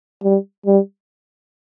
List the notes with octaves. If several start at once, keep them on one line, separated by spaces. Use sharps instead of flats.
G3
G3